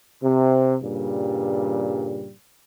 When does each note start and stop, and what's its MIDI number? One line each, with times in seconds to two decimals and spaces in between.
0.23 0.77 48
0.83 2.31 43
0.83 2.31 46
0.83 2.31 49
0.83 2.31 55